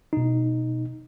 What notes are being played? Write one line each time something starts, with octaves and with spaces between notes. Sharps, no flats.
B2 D#4